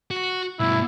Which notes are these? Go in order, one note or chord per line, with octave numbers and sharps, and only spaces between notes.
F#4
G2 B2 E4